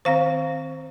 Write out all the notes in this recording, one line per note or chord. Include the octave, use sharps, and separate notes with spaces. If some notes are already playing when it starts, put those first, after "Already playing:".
D#3 C4 C5 F5